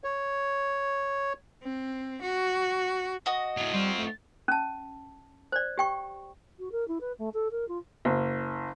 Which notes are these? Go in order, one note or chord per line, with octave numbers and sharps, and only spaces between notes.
C#5
C4
F#4
F#4 D#5
A2 F#3
G3 C4 F4
A3
C#4 A5
C5 D5
G4 G5 C#6
F#4
A#4
E4
B4
A3
A4
A#4
F4
F#1